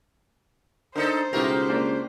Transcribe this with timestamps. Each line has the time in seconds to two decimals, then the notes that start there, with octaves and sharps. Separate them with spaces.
0.96 D4 D#4 A4 A#4 C5
1.33 C#2 B2 A3 D#4 E4 G4 A#4
1.69 A#3 D4